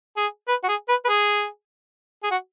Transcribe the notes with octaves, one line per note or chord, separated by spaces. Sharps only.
G#4
B4
F#4
G#4
B4
B4
G#4
G#4
F#4